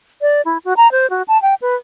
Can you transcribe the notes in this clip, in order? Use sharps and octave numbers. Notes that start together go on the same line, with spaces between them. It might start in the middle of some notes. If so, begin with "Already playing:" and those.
D5
E4
F#4
A#5
C5
F#4
A5
G5
B4